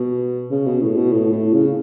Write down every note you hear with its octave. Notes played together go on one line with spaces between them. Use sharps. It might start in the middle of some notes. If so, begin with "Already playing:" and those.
Already playing: B2
C#3
B2
A2
B2
A2
A2
C#3